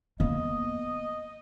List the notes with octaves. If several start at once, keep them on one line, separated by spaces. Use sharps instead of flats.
A#3 B3 D#5